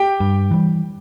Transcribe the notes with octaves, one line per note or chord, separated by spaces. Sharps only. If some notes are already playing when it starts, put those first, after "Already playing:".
Already playing: G4 G5
G2
E3 G3